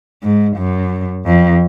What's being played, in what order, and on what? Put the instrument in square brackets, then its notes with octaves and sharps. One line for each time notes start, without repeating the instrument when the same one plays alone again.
[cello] G#2
F#2
F2